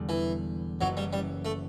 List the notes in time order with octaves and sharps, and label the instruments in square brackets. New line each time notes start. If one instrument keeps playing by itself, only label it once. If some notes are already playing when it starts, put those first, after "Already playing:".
Already playing: [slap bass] E1 E2 D3 G3
[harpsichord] E3
[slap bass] F#1 F#2 E3 [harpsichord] F#3
[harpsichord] G3
G3
A3